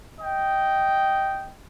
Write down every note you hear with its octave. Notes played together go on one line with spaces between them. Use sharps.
D#5 G5